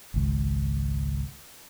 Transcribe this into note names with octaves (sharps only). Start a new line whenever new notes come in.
G#1 C#2